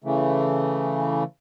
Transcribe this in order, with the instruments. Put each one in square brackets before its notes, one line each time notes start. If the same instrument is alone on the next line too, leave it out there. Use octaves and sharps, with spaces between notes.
[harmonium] C#3 E3 A3